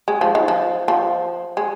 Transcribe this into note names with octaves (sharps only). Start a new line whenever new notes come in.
G#3
F3
D#3
F3
F3
G#3